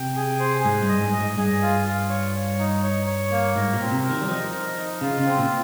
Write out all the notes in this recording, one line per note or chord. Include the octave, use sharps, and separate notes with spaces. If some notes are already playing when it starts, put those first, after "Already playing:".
Already playing: C3 G5
G#4
C5
G#2 G#4
G2
D#5
G#2
D#5
G#2
G2 G#4
F4
F4
C#5
C#5
D#4
C#5
C#5
A#3
G#2 A#4
A#2
C4
A#2
C3
A#4
D#3
G3
F3 D#4
A#4
D#4
C#3 F4
C#3
C4
A#2